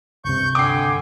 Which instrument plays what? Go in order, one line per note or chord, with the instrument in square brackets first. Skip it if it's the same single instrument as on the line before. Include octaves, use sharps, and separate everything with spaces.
[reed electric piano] C#2 G2 C3 [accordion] C#6 G6
[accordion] D3 [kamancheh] G5 G#5 [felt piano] D6 C7